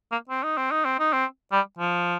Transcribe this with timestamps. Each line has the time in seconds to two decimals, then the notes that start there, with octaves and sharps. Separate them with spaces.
0.12 A#3
0.29 C4
0.44 D#4
0.57 C4
0.71 D#4
0.85 C4
0.99 D#4
1.13 C4
1.52 G3
1.78 F3